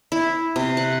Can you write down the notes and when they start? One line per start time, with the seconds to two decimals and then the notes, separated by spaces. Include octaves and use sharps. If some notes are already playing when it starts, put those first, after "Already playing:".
0.12 E4
0.56 C3
0.77 F#5